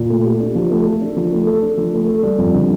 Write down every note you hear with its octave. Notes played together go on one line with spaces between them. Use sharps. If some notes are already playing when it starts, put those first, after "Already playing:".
Already playing: A#2
A3
G4
D4
F3
A3
A4
D4
F3
A3
A4
D4
F3
A3
A4
G3
F2
D3